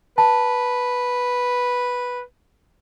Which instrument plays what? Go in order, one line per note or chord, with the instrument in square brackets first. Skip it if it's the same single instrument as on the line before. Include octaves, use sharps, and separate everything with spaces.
[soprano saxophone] B4 [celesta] A5